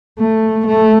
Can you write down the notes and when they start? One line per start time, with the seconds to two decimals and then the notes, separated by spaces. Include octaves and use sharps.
0.19 A3
0.67 A3